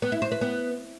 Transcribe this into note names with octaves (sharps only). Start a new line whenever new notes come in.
B3
E4
C5
B4
B3